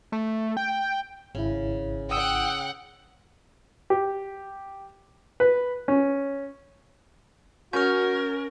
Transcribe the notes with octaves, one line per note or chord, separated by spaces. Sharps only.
A3
G5
G#1 C#3 E4
F#5 G5 D#6 E6
G4
B4
C#4
C#4 F#4 A#4 F6 G6